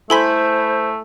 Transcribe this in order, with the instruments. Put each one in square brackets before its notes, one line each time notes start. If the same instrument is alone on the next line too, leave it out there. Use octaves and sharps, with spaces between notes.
[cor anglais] A3 [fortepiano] E4 G#5 B5 [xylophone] A4 C6 B6 [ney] C5